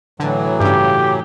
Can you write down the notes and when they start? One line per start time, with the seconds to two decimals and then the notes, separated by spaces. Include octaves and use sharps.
0.20 A2 D3 E3 F#3
0.60 G2 C#3 G4